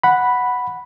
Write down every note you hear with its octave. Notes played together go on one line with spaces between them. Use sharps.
F#5 B5